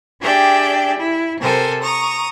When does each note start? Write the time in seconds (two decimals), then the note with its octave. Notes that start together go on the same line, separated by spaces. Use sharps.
0.21 D4 G4 G#4 D5 E5 G5
0.97 E4
1.40 C3 A4 A#4 C5 G#5
1.82 A#5 C#6 D#6